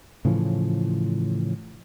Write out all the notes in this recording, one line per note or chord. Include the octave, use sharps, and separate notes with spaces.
A2 C#3 E3 F3